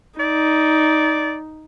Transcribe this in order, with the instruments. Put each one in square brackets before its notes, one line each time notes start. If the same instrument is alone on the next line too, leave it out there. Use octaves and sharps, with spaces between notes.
[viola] D#4 [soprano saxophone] D5